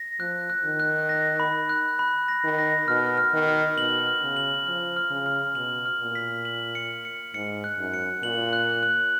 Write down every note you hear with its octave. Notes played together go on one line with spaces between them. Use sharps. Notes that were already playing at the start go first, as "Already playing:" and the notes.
Already playing: A#6
F3 F#6
F#6
D#3
F#6
A#6
B5
F#6
B5
A#6
D#3
A#6
B2 F6
F6
D#3
F6
B2 F#7
F6
C#3
F#7
F3 F6
F6
C#3
F6
B2 F#7
F6
A#2
B6
F#7
C#7
C#7
G#2 C#7
F#6
F#2
C#7
A#2 F#7
F#6
F#6